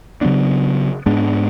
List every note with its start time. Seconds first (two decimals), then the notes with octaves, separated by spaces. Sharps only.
0.21 C#3 F#3 B3 D4
1.06 G#2 G#3 B3 D4